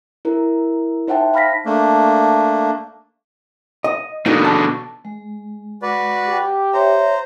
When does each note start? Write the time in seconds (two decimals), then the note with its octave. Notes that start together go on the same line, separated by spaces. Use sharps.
0.25 E4 A#4
1.08 D#4 C5 E5 F#5 G5 A5
1.34 F5 B5 F6 A#6 B6
1.66 A3 A#3 D4
3.84 D#5
4.26 B2 D3 A#3 D#4
4.45 A5
5.05 G#3
5.82 F#4 B4 D5
6.27 G4
6.74 C5 C#5 E5 A#5